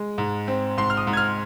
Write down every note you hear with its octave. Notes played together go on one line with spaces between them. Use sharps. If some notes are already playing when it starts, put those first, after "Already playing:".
Already playing: G#3
G#2
C4
G#2 C6
F6
D#6
G#2
G#6
F6